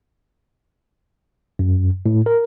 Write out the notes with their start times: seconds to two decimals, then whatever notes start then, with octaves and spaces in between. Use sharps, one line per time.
1.59 F#2
2.06 A2
2.26 A#4